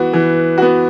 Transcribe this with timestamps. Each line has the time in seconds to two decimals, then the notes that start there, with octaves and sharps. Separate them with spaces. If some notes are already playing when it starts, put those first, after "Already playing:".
Already playing: E3 B3 F#4
0.13 E3
0.58 B3 F#4